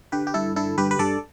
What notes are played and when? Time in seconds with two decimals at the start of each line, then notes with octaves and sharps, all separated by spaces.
0.12 D3 G4 B4
0.27 G4
0.34 G2 E4 A4
0.56 D3 E4 A4
0.78 G2 G4 B4
0.91 B4
0.99 G2 A4 D5